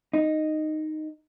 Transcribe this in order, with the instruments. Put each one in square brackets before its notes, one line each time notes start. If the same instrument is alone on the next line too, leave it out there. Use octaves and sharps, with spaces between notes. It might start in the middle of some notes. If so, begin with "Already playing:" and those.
[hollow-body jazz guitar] D#4